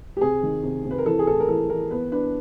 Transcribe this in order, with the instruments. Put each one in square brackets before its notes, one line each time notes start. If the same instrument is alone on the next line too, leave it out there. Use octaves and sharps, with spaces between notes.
[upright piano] G4
C3 G#4
D#3
C3
C3
B4
A#4
E3 A4
G#4
A2 A4
A#4
E3 A4
E3 A#4
B3 B4
D4 B4